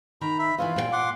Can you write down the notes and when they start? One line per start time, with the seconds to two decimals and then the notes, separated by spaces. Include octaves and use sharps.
0.21 D#3 A#5 B5
0.39 E5 B5
0.58 E3 F4 C#5 D#5 F5
0.76 A#2 B4 G5
0.92 F#5 C6 D6